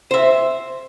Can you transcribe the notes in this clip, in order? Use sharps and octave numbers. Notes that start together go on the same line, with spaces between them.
C5 E5